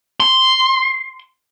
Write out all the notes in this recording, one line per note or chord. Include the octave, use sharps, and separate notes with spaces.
C6